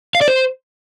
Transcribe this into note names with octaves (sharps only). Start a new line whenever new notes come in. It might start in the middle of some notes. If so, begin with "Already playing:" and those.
F5
D5
C5